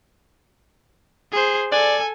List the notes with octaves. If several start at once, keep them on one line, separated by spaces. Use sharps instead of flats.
G#4 C5
A4 D5 G#5